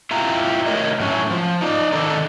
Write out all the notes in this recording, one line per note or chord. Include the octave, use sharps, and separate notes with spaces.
E4 F4 G4 A#5
A3 A#4 C#5 D#5
A2 F#3 C#4
F3
D#4 D5
D#3 A4 A#4 D5